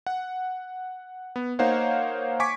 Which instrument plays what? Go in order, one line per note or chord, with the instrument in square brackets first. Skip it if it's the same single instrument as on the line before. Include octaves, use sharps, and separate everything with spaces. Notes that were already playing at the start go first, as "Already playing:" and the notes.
[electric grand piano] F#5
B3
A#3 D#4 C5 C#5 F5 F#5
G#5 C#6 D6 G#6 B6